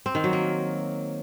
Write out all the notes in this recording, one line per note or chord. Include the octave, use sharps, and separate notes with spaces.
C4
D#3
F#3
A#3